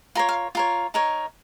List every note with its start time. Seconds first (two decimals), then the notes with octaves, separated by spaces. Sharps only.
0.15 F4 A#4 C#5 C6
0.29 F5
0.55 F4 A#4 C#5
0.94 D#4 A#4 C#5